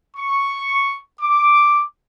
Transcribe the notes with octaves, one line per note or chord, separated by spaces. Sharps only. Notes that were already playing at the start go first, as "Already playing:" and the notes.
C#6
D6